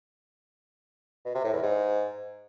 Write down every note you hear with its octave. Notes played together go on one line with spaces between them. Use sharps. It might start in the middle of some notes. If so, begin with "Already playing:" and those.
B2
C3
A2
E2
G#2